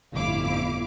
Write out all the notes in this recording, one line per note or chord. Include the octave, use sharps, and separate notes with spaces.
G1 F2 A2 E4 F5 D6